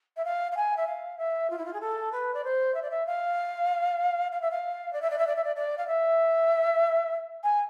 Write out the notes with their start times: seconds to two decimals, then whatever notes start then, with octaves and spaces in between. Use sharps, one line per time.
0.16 E5
0.25 F5
0.51 F5
0.57 G#5
0.76 E5
0.87 F5
1.18 E5
1.50 F4
1.58 E4
1.65 F4
1.73 G#4
1.81 A4
2.12 B4
2.34 D5
2.44 C5
2.74 E5
2.82 D5
2.90 E5
3.06 F5
4.31 F5
4.41 E5
4.50 F5
4.93 D5
5.02 E5
5.10 D5
5.18 E5
5.27 D5
5.36 E5
5.44 D5
5.56 D5
5.77 F5
5.87 E5
7.43 G#5